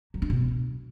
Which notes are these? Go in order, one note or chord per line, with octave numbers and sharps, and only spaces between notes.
F#3
D4
B2